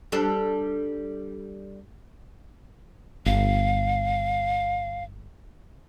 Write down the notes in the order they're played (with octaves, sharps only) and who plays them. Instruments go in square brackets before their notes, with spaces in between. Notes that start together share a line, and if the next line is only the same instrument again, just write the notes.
[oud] G3 D4 A4
[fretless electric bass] G1 [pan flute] F5